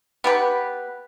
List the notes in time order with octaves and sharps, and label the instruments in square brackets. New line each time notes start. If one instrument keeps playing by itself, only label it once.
[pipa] B3 G4 B4